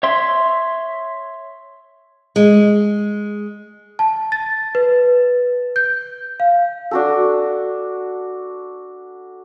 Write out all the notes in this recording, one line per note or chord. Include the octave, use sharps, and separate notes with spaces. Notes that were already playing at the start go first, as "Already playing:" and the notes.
C#5 E5 C6
G#3
A5
A6
B4
G6
F5
D4 F#4 A4